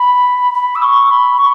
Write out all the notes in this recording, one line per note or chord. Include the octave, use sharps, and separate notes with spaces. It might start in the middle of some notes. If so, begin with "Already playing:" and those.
Already playing: B5
B5
E6
C#6
B5
C#6